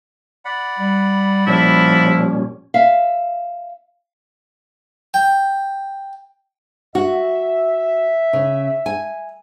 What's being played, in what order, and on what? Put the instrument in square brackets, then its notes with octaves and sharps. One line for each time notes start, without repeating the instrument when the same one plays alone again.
[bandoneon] D5 F#5 B5
[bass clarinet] G3
[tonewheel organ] A#2 G3 C#4 [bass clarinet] F3 [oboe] E4
[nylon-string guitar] E5 F5
[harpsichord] G5
[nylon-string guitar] F#4 [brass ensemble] E5
[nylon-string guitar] C#3
G#5